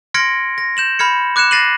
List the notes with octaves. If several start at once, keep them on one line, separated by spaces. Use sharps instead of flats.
C6 F6 G#6 A#6 C#7 D7
A#6
G6 E7 F#7
B5 F6 G#6 C#7
D6 F#6 G#6 C#7 E7
A6 A#6 C7 D#7 E7 F#7